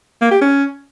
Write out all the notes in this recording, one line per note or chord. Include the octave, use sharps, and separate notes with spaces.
A#3
G4
C#4